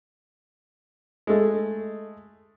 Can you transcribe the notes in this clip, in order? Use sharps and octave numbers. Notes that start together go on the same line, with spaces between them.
G#3 A3